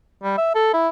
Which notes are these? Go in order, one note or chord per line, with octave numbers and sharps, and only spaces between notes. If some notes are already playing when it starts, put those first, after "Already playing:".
G3
E5
A4
E4